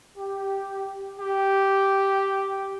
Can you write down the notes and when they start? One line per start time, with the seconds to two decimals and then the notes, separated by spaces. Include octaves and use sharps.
0.16 G4
1.19 G4